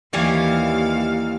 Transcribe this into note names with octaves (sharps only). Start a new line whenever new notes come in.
D#2 E3 G3 C#5 F5